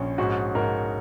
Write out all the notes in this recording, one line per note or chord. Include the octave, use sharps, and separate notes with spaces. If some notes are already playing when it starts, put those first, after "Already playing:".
Already playing: A#1 C#4
G#2 F#4
G#2 A#4